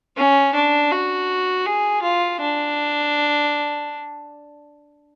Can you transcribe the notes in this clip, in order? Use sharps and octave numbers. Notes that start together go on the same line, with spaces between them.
C#4
D4
F#4
G#4
F4
D4